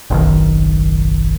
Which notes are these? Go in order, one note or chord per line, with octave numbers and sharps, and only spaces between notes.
F#1 B1 D#3